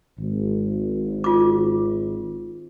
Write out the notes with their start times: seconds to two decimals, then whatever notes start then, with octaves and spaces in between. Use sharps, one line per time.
0.19 G#1
1.24 F4 D6